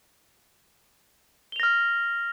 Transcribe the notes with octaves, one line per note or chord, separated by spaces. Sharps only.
F6 A#6 F7 G7